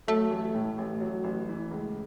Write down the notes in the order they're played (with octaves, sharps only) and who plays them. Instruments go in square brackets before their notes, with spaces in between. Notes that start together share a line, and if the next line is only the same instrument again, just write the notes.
[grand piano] F#3 [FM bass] A3
[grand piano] A1
A2
A1
F#3
A1
E3
C#2